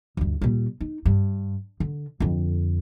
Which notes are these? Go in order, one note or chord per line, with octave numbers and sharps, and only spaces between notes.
D2 G2
A#2 G3
D#4
G2
D3
F2 D3